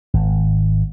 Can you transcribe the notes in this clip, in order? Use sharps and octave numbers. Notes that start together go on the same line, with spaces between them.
G#1